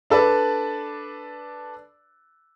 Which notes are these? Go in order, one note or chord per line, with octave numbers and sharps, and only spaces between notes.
D4 A4 B4 D5